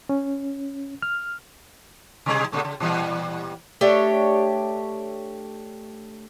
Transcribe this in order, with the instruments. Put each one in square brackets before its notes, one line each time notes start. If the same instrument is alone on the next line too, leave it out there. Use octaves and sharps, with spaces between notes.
[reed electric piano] C#4
F6
[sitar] B2 G3 G#4
A#2 C#3 A3
C#3
A#2 E3 G3
[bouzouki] A3 D4 G4 C#5